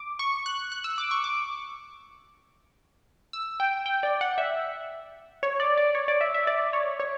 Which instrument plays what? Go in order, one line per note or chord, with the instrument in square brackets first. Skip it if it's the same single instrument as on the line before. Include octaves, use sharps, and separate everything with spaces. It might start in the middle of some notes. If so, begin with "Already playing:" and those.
Already playing: [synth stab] D6
C#6
F#6
F#6
E6
D6
C#6
D6
E6
G5
G5
D5
F#5
E5
C#5
D5
D5
C#5
D5
E5
E5
D5
C#5
C#5